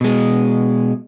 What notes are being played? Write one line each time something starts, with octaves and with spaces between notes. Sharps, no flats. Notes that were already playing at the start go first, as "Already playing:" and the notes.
B2 G#3